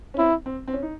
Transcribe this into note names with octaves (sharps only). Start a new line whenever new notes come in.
C#4
C4 E4
C4
C4
C#4
D#4